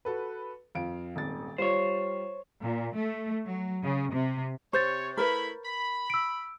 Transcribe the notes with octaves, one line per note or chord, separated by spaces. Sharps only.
F#4 A4 B4
F2 F5 D7
D#1 G#1 A6
G3 F4 C5 C#5
A#2
A3
F#3
C#3
C3
C3 C5 C#5 C#6 G6 A6
A3 E4 A#4 B4 B5
B5
E6 D7